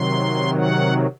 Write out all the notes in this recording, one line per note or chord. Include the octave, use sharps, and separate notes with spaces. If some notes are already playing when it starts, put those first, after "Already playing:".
Already playing: C3 D#3 F#3 C6
F#5